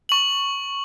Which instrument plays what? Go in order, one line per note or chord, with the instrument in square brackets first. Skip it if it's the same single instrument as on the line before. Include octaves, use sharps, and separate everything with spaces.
[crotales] C#6 F#7